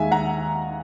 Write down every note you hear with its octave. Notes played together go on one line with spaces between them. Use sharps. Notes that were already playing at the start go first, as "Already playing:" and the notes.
Already playing: D#2 D#3 G#3 E5 G#5
F#5 A#5